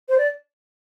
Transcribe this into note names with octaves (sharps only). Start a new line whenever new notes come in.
C5
D5